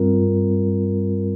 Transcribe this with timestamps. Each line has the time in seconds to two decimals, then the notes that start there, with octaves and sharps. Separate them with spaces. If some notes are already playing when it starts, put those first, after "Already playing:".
Already playing: G2 G3 C4 F4 A#4